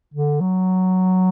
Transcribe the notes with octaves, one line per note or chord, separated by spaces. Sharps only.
D3
F#3